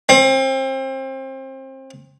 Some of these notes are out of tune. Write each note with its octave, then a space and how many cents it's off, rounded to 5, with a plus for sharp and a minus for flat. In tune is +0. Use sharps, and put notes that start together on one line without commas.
C4 +30